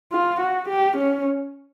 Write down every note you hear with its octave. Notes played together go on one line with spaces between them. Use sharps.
F4
F#4
G4
C#4